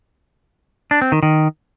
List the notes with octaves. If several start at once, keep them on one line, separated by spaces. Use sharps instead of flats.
D4
C4
D#3
D#3